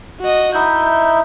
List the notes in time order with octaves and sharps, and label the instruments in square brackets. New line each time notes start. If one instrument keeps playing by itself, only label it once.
[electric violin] F#4 D#5
[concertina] D#4 E4 E5 [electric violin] G6